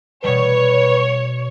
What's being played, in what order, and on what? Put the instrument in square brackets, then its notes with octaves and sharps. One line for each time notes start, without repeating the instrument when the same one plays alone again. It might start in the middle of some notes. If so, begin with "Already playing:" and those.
[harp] B2 G3 [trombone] B4 [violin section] C#5